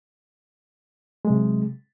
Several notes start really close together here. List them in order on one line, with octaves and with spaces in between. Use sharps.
G#3 F#3 C3